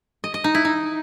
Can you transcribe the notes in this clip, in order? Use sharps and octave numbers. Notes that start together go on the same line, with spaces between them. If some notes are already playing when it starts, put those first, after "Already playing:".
D#5
D#5
D#4
E4
D#4